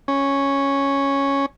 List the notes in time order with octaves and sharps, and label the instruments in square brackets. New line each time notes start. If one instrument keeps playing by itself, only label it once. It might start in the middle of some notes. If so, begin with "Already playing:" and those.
[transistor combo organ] C#4